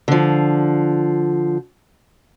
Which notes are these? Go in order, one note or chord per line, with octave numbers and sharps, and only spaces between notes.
D3 F3